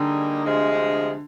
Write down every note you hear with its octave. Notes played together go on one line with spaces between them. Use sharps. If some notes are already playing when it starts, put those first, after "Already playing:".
Already playing: D3 G3 A#3 D#4 G#4
D2 C3 F3 G#3